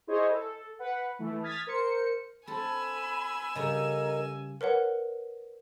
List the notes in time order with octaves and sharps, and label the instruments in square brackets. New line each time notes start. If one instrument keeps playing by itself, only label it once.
[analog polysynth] E4 G#4 C5 C#5 D#5
A4
B4 F#5
E3 A3
D#6 F6 G#6 A6 B6
A#4 C5 C#7
[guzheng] C4 A4 [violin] G#5 E6 [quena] B5
[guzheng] C#3 G3 C#4 [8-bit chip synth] A4 A#4 D#5 [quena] A#5
[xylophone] A#4 B4 C#5 F#5